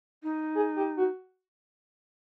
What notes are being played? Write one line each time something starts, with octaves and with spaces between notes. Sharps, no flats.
D#4
G#4
G4
F#4